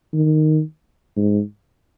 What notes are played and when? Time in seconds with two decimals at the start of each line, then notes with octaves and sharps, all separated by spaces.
0.13 D#3
1.16 G#2